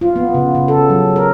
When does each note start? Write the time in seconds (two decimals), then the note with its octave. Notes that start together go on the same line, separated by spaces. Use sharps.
0.01 F4
0.16 B3
0.34 C#3
0.55 C#3
0.68 A4
0.90 F#3
1.16 A#4